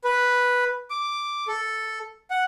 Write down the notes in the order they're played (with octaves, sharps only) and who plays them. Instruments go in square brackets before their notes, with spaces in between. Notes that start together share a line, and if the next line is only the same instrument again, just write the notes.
[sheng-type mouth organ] B4
D6
A4
F#5